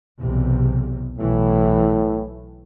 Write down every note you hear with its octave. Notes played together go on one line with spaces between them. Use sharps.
B1 E2 C3
B1 A2 E3